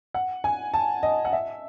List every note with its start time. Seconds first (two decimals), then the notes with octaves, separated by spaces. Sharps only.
0.14 F#5
0.44 G#5
0.74 A5
1.03 D#5
1.25 F#5
1.33 E5